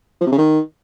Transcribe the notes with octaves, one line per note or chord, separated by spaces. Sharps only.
F3
C3
C#3
D#3